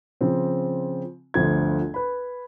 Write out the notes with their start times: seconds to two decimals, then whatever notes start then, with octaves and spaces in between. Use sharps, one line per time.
0.21 C#3 F3 C4
1.34 G1 D2 F3 G#6
1.94 B4 B5